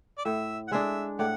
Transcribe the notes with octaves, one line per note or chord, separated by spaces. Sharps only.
D5
A2 E5
F#5
G#3 D4 G#4 E5
A2 D5 F#5